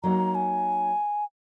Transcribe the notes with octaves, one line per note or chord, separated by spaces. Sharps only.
F#3 A#3 D#4 A#5
G#5